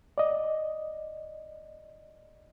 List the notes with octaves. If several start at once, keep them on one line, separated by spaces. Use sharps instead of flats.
D5 D#5